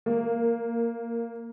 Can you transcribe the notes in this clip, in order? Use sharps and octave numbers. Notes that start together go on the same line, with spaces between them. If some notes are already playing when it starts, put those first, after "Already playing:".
A#3